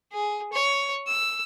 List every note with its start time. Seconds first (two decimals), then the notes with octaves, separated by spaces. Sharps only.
0.13 G#4
0.52 C#5
1.07 E6